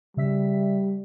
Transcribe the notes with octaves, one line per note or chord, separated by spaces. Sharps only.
C#3 G3 E5 B6